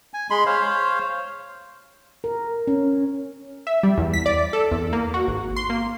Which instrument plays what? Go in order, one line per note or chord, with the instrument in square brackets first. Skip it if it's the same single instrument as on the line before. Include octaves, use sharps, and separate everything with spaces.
[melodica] G#5
G#3 B5 C6
C5 C#5 F5
[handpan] A#4
C#4
[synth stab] E5
G3
E2
B6
D5
A4
E2
A#3
F#4
G#1
C6
A#3